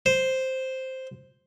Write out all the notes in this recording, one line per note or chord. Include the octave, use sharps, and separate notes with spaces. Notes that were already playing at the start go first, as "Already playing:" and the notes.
C5